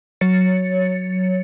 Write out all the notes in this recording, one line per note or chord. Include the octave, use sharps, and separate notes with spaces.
F#3 C#5 A6 C#7